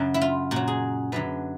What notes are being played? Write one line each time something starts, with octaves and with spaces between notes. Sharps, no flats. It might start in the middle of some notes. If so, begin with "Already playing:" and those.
Already playing: F#2 C#3 F#3
E4
F4
A#2 F#3 F#4
G#4
F#2 D3 F#3 B4